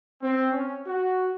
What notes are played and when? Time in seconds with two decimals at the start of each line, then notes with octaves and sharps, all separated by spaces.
0.23 C4
0.52 C#4
0.87 F#4